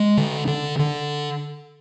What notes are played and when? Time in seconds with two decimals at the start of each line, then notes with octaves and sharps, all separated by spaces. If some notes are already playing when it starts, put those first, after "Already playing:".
Already playing: G#3
0.17 D3
0.47 D3
0.79 D3